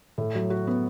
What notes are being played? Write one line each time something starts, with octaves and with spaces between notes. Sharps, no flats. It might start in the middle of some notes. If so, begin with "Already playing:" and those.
A2
F#3
F#4
B3